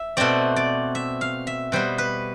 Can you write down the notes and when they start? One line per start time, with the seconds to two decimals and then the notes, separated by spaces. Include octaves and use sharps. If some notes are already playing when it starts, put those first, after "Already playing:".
Already playing: E5
0.17 B2 A3 C4 D5
0.56 D5
0.95 E5
1.21 F5
1.47 E5
1.72 B2 G3 B3 C5
1.98 B4